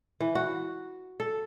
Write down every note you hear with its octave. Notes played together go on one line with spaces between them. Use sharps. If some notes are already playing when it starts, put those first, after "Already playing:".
E3
F#4
A4